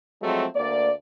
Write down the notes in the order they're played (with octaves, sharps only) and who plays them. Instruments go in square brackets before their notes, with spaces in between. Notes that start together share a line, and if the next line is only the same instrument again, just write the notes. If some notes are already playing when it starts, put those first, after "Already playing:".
[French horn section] F3 F#3 G#3 A3 C4
D2 A#3 D5